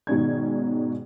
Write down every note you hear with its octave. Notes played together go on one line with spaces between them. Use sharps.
G#2 B2 D#3 C#4 D5 G#6